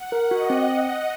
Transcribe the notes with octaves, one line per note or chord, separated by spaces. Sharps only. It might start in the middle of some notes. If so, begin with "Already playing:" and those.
Already playing: F#5
A#4
F#4 D#5
C4